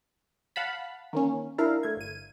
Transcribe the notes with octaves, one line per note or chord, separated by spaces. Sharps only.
F5 F#5 A5 B5
D#3 A#3 C#4
D4 E4 A#4 E5 F5
A3 G#6
G1 D#7